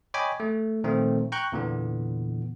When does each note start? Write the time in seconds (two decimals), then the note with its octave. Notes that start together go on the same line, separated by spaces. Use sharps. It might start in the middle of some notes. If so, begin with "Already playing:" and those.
0.14 C#5 D#5 G5 G#5 B5 D6
0.40 A3
0.84 A#2 D#3 F3 A3 C4
1.32 G5 A#5 C#6 F#6 G6
1.52 E2 A#2 D3 E3 B3